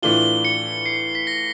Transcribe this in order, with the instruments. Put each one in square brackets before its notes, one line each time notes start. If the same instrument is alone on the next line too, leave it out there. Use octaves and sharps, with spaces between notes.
[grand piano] A2 E3 A3 D4 F4 [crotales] G7
[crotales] C#7
C7
B6
A#6